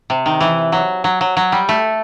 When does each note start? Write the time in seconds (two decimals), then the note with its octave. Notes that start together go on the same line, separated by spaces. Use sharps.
0.10 C3
0.26 D#3
0.40 E3
0.72 F#3
1.04 F#3
1.21 F#3
1.37 F#3
1.52 G3
1.69 A3